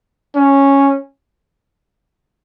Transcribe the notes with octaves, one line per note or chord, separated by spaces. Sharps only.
C#4